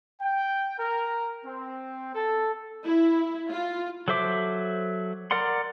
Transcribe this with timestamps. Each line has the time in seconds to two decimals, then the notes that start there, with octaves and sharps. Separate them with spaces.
0.21 G5
0.79 A#4
1.46 C4
2.14 A4
2.84 E4
3.49 F4
4.08 F#3 A4 C5 E5 D6
5.31 A#4 D5 F#5 C6